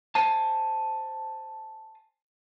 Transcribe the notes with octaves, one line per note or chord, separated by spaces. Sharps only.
C5 G#5 A5